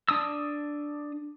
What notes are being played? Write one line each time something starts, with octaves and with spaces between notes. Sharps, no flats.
D4 D#6 E6